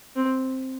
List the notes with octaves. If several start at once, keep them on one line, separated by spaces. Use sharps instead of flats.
C4